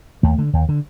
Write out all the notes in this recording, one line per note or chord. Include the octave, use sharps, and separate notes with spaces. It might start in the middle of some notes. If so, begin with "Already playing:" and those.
D#2 A3
D3
D#2
D3